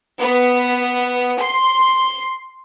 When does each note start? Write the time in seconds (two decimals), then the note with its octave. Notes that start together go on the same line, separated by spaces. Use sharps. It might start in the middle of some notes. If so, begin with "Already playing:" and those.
0.20 B3
1.39 C6